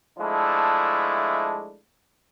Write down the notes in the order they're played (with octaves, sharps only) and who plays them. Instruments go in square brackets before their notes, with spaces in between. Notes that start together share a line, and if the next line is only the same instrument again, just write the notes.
[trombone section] F3 G#3 A3 D4 E4